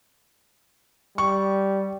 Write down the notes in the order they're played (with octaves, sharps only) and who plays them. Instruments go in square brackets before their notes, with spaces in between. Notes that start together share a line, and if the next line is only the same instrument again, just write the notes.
[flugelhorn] G3 [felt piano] C#6